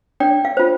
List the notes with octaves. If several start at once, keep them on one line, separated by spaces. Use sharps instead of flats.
D4 D5 G5
F5
F4 C5